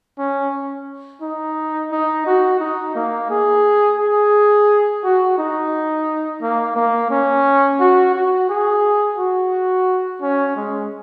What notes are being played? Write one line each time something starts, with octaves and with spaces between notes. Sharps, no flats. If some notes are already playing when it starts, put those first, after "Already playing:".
C#4
D#4
D#4
F#4
D#4
A#3
G#4
G#4
F#4
D#4
A#3
A#3
C#4
F#4
F#4
G#4
F#4
C#4
G#3